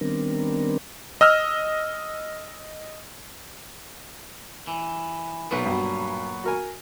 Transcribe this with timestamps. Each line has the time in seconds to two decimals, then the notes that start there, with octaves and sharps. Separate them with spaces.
0.01 D#3 G3 B3 C4 D4 A#4
1.21 D#5 E6 F6
4.67 E3
5.51 B1 A#2 F#3 B3 B4
5.66 G2 B2
6.44 F#4 A#4 G#5